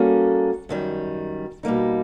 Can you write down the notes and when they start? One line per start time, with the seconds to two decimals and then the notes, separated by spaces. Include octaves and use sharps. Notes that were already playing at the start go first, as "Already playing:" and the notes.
Already playing: G3 A#3 C#4 F#4 A4
0.69 F#2 D#3 G3
1.63 B2 G3 A#3 D#4